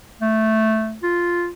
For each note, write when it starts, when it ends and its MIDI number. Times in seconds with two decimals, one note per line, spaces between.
0.21 0.96 57
1.03 1.49 65